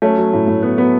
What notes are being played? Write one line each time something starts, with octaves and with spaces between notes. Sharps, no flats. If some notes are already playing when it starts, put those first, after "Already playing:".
F#3 A3 C#4
F#3
A2
A2
F#3 B3
F#3 B3